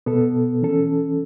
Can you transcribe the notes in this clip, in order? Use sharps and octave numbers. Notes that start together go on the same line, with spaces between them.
B2 B3 A4
E3 C#4 A4